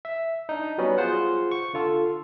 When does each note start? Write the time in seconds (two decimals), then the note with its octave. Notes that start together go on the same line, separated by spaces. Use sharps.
0.05 E5
0.49 D4 D#4
0.78 F#3 G3 B3 C#4 F#4
0.98 F4 G#4 C5 F#5
1.51 C#6
1.74 D3 F4 A4